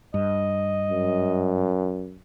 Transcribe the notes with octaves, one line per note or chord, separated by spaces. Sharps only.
G2 D#5
F#2